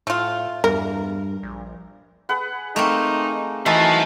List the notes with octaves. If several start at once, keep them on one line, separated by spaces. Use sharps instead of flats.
A2 A3 F4
E2 G2 A#4
A#1
G#4 B4 F#5
A3 A#3 C4 D#4
E3 A3 D#4 F#4 C5 D#5 E5 A5